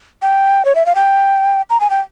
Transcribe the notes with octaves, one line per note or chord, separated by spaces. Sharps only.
G5
C#5
E5
F5
G5
A#5
G#5
G5